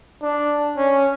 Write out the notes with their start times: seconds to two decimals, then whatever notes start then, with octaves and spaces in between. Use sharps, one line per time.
0.23 D4
0.77 C#4